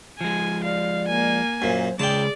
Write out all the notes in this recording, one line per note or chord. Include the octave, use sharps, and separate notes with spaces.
F3 G#3 G#5
D5 F5
A#3 G#5
F#2 A#2 C5
C#3 G#3 G#4 D5 G5 A5